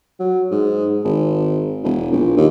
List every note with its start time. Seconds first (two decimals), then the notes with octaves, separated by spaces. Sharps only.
0.19 F#3
0.51 G#2
1.05 G#1
1.84 E1
2.12 A#1
2.37 D#2